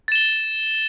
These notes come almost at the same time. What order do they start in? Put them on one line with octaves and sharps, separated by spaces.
A6 E7 G7